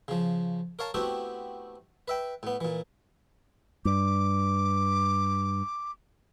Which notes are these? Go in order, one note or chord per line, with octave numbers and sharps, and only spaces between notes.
C#3 F3
A#4 C#5 F5 A5
A3 B3 C4 E4 F#4 G4
B4 E5 G5
A2 B3
A#2 E3
G2 D6